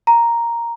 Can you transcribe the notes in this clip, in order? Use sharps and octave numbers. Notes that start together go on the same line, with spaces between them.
A#5